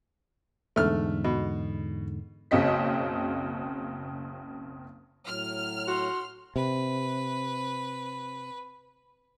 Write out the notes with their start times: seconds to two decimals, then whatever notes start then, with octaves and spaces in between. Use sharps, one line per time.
0.76 E2 G#2 D3 A3 F6
1.24 B2
2.51 F#1 B1 C#3 C4 D#5 B6
5.27 A2 F#3 F6
5.88 F#4 C6
6.56 C3 B4